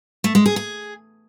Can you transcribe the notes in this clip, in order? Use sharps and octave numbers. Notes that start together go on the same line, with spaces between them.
A3
G#3
G#4
G#4